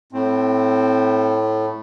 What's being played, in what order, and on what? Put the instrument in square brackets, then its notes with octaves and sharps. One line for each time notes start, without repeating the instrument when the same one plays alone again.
[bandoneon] A2 [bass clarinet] C4